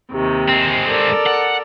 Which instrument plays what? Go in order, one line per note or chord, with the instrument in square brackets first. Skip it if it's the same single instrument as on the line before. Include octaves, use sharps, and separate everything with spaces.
[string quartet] D#2 C3 D#3
[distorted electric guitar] G#3 C4
[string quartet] A4 A#4 D5
[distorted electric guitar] F#5